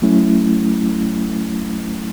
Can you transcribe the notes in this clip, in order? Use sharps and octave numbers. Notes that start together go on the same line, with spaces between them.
F#3 A3 C#4 E4